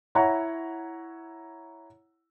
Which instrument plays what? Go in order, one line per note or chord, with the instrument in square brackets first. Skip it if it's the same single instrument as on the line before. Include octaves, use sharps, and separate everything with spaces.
[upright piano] E4 C#5 F#5 A#5